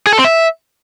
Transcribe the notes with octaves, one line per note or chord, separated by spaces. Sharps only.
G#4
A4
C4
E5